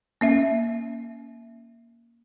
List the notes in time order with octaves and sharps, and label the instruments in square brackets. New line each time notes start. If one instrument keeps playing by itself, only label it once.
[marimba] A#3 C#4 E5